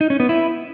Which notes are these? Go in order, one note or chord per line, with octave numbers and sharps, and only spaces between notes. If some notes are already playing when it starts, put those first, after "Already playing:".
D#4
C#4
B3
E4